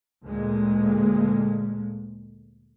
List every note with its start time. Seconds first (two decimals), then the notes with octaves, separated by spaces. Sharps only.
0.23 D2 A#2 G#3